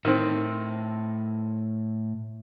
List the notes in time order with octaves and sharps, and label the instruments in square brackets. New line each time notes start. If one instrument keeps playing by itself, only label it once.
[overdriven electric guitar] A2 [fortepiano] D#3 C4